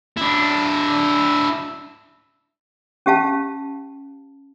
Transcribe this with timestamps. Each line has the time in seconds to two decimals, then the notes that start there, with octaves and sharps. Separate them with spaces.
0.17 D4 E4
3.06 C#4 G4 F5 A5